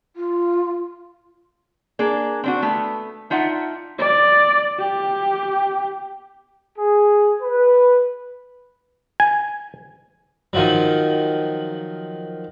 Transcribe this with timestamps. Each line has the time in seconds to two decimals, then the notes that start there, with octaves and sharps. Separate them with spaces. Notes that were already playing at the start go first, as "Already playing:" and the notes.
0.16 F4
1.99 A#3 D4 G#4
2.44 C4 D4 F#4
2.62 A3 B3
3.30 D4 D#4 F4 E5 F#5
3.99 D5
4.79 G4
6.79 G#4
7.42 B4
9.20 G#5
10.53 D#3 F3 F#3